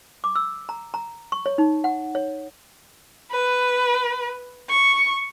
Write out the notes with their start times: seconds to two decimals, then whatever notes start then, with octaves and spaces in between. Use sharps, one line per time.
0.24 D6
0.36 E6
0.69 A#5
0.94 A#5
1.32 C#6
1.46 C#5
1.58 D#4
1.84 F#5
2.15 C#5
3.32 B4
4.70 C#6